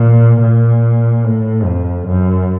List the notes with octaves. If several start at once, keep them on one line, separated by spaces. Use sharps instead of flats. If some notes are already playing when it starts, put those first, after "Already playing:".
Already playing: A#2
A#2
A2
F2
F#2